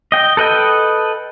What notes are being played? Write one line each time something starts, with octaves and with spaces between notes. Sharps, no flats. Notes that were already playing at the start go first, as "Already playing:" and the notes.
D#5 G5
A4 B4 D#5 G5